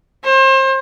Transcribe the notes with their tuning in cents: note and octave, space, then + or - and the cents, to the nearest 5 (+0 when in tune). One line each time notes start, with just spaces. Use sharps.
C5 +35